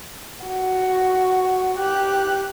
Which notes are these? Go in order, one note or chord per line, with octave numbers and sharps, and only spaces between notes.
F#4
G4 F#6